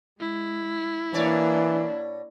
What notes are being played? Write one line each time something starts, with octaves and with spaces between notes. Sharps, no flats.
G#3 E4
B2 E3 A#3 D4 C#5 D5